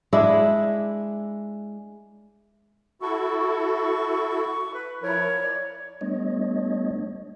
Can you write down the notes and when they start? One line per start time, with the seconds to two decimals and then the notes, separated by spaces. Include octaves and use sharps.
0.13 G#3 D4 E4
3.01 E4 F#4 A4 C#6
3.40 C#6
4.74 B4
5.02 F3 E4 A#4 C#5
5.43 D5
6.01 G3 A3 B3 D4 C#5 D#5